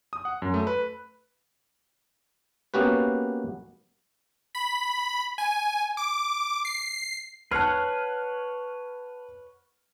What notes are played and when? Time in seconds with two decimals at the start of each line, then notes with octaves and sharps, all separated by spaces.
0.13 D#6
0.25 F#5
0.42 F#2
0.54 A3
0.67 B4
2.74 A#3 B3 C#4 F#4 G4 B4
4.55 B5
5.38 G#5
5.97 D6
6.65 C7
7.51 B4 C#5 F#5 A5 F6 F#6 C7